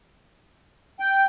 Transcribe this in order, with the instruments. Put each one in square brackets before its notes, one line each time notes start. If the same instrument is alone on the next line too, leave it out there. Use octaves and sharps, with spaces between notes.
[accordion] G5